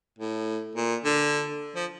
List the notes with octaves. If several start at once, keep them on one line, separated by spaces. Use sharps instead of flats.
A2
A#2
D3
F3